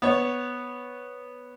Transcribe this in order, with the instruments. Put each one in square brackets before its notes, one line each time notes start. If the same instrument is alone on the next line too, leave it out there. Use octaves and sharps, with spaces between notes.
[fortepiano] B3 C#5